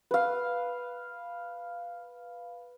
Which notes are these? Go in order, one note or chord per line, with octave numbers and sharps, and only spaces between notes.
B4 F5